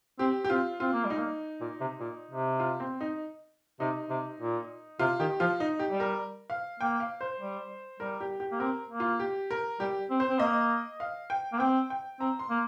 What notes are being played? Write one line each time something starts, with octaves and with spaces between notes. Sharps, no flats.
C4 G4
G4
C4 F4
C4 F4
A#3
G3
D#4
A#3
A#2
C3
A#2
C3
F4
C4
D#4
C3 D#4
C3
A#2
C3 F4
D#3 G4
F3 F4
D#4
G4
G3
A#4
F5
A#3 G5
F5
C5
G3
G3 A#4
G4
G4
A#3
C4 A#4
A#3
F4
G4
A#4
G3 G4
C4
C5
C4
A#3 D#5
F5
G5
A#3
C4 G5
G5
C4 A#5
C6
A#3